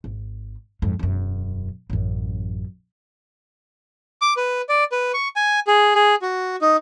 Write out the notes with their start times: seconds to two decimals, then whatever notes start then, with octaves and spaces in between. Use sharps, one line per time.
0.04 G#1
0.82 F2 G#2
0.99 E1 F#2
1.90 A1 F#2
4.22 D6
4.37 B4
4.69 D5
4.92 B4
5.14 C#6
5.36 G#5
5.67 G#4
5.95 G#4
6.22 F#4
6.61 D#4